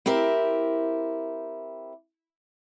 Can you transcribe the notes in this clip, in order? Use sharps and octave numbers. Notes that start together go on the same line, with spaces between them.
C4 E4 G4 A#4